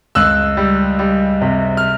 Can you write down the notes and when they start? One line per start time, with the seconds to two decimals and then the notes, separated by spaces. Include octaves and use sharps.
0.15 C#2 E6 F#6
0.57 G3
0.99 G3
1.42 C3
1.77 F6